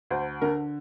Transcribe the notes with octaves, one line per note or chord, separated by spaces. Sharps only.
D2 C5
D3 A#4